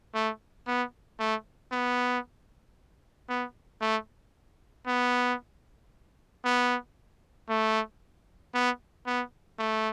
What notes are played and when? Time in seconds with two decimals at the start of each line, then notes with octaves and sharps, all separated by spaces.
0.14 A3
0.67 B3
1.19 A3
1.72 B3
3.29 B3
3.81 A3
4.87 B3
6.45 B3
7.49 A3
8.54 B3
9.06 B3
9.59 A3